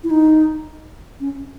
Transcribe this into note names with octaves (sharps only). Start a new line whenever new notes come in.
E4
D#4
C#4